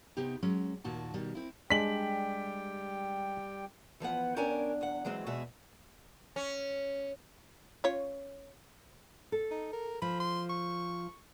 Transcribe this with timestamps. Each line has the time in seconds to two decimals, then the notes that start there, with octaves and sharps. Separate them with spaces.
0.17 C3 B3 D#4 G4
0.43 F#3 G#3 C#4
0.84 D#2 A#2 F#4 A5
1.14 B2 D#3 G3
1.35 C4 E4
1.70 G3 G#3 D4 G4 G5 B6 F#7
4.00 E3 F3 B3 F#5
4.36 B3 C#4 D4 A#4 G5 G#5
4.81 E2 F#5
5.05 E3 F#3 G#3 C4
5.26 E2 B2 G#3 F#4 G#4 E5
6.36 C#4
7.84 C#4 F4 C#5
9.32 A4
9.51 D#4
9.73 A#4
10.02 F3 B5
10.20 C6
10.50 C#6